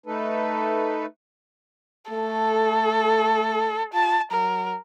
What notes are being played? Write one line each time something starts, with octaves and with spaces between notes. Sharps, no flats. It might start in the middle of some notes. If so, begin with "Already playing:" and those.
A3 D#4 A4 B4
A3 A4
F4 A5
F#3 A#4